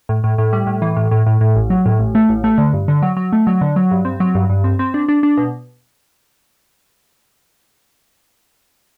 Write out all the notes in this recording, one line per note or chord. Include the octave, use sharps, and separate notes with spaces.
A2
A2
A2
G3
A2
E3
A2
A2
A2
A2
A1
F#3
A2
A1
A3
A1
A3
D3
G2
D3
F#3
F#3
A3
F#3
D3
F#3
G2
C4
F#3
G2
G2
C4
C4
D4
D4
D4
B2